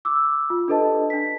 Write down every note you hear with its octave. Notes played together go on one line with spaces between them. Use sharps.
D6 E6
F4
D4 G4 A4 B4 D#5 A5
D4 B6